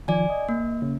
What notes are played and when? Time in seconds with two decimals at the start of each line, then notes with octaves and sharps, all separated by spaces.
0.08 D#3 F3 D5 G#5
0.30 D#5
0.49 A#3
0.82 C#3 C#4